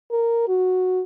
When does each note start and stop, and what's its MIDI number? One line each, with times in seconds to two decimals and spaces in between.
0.11 0.45 70
0.48 1.03 66